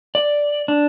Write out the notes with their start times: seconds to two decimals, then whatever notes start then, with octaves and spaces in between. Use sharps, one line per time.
0.15 D5
0.68 D4